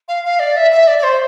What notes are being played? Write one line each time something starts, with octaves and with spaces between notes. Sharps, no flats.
F5
F5
D5
E5
E5
D5
D5
C5